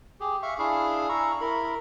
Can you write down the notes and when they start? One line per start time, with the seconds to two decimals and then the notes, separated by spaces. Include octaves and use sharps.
0.20 G4 G#4
0.43 E5 F5 C#6
0.59 D4 E4 G#4 F5
1.09 E4 A#5 C#6 E6
1.41 E4 A#4 B5